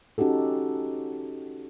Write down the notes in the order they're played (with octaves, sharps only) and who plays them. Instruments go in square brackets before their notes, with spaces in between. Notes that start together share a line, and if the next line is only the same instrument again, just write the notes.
[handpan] C#4 D#4 F#4 G4 A4